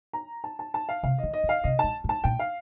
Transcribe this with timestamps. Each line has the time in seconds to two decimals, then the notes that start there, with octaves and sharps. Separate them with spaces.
0.13 A#5
0.44 A5
0.59 A5
0.74 A5
0.89 F5
1.03 C3 F5
1.18 D#3 D#5
1.34 D#5
1.44 D3
1.49 F5
1.64 C3 D#5
1.79 A#2 A5
2.04 A2
2.09 A5
2.24 A#2 G5
2.39 F5